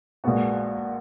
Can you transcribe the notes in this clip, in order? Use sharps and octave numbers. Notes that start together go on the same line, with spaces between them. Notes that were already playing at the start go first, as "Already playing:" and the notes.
A#1 A#2 G#3 B3 F#4